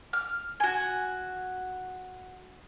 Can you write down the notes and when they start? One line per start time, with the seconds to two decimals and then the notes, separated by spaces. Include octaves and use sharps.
0.13 F6
0.60 F#4 G#5